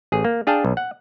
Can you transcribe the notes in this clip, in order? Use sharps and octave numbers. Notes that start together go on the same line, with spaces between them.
A1 G#4
A#3
D4 G#4 F5 G5 A5
B1
F#5